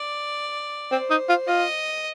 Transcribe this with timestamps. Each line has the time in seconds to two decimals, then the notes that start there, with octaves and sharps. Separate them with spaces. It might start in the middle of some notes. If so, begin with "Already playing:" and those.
Already playing: D5
0.92 C4 C5
1.10 D#4
1.29 F4
1.48 F4 D#5